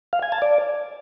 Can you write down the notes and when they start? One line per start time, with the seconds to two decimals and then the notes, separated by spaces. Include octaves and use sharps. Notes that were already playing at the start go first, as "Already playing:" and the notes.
0.13 F5
0.22 G#5
0.32 A5
0.42 D5